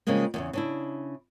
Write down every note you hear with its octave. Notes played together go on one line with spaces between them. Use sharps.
C#3 F3 G3 G#3 A#3
E2 A#2 C#3
C#3 D4 E4